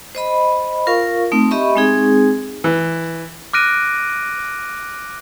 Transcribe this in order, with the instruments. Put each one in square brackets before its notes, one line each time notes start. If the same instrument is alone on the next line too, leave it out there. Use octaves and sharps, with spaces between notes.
[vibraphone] C5 D#5 B5
F4 A#4 F5 C#6
A3 C4 D#4
G4 D#5 E5 B5 C#6
G#3 C4 D#4 G#4
[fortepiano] E3
[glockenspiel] D6 F6 F#6 A#6 D7 D#7